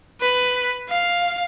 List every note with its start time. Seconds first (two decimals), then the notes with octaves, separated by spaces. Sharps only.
0.22 B4
0.90 F5